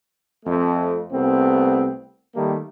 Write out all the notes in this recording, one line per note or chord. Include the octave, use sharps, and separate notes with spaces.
F2 A3
C2 A3 B3 C4
D#3 G3 A3 A#3